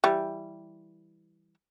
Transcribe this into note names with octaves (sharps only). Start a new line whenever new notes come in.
E3 G3